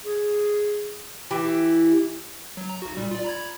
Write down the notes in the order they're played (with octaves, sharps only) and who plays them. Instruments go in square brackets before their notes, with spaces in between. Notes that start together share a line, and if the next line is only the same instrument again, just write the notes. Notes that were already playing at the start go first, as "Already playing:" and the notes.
[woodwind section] G#4
[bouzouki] E3 E4 G4
[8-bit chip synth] F#3
A#5
B1 F#4
A#2 G3
F4 D5
A#5 B5 G#6